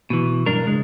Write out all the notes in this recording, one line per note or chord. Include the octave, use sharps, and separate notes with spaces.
B2 E3
B1 G2 D4 A#4
C#2 G#3